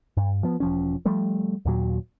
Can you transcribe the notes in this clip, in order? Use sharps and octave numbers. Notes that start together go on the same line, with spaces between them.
G2
F3 B3
E1 F3 C#4
F3 G3 A3
D#2 A#2 F#3